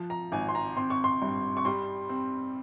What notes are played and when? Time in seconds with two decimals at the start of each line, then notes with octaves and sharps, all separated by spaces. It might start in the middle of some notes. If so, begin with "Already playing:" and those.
Already playing: F3
0.10 A#5
0.32 G#1 G#5
0.49 C6
0.55 A#5
0.77 C4 C6
0.90 C#6
1.04 C6
1.22 G2
1.57 C#6
1.65 G3 C6
2.09 C4